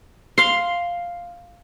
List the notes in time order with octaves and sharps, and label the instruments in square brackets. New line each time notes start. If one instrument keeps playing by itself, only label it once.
[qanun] F5 C6